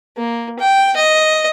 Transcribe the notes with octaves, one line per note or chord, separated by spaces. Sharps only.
A#3
G5
D#5